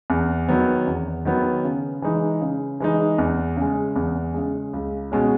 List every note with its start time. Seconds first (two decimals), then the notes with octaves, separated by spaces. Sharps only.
0.10 E2
0.48 D#3 F#3 B3
0.87 E2
1.25 D#3 F#3 B3
1.64 C#3
2.02 E3 G#3 D#4
2.41 C#3
2.80 E3 G#3 D#4
3.18 E2
3.57 C#3 G#3
3.96 E2
4.34 C#3 G#3
4.73 C#2
5.12 B2 G#3 C#4